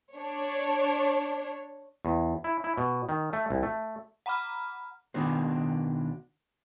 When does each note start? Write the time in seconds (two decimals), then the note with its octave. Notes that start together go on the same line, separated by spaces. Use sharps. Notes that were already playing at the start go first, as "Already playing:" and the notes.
0.15 D4 C#5
2.05 E2
2.44 E4
2.64 E4
2.78 B2
3.09 D#3
3.33 A3
3.50 C2
3.63 A3
4.26 F#5 A#5 B5 D6 F6
5.14 B1 D#3 B3 D4 F#4 C5